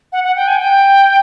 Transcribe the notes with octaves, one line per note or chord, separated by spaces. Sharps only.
F#5
F#5
G5
G#5
G5